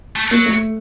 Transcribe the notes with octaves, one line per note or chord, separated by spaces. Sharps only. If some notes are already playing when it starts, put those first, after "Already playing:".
A3
F#3 A#3
A3